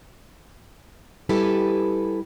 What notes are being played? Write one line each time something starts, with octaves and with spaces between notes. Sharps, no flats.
G3 E4 G4 A4 B4 G#5